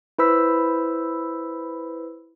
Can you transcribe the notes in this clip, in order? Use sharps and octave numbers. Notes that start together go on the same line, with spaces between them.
E4 B4 C5 B5 E6 B6